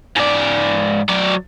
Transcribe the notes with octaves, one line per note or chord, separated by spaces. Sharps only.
G#2 D5
F#3 D5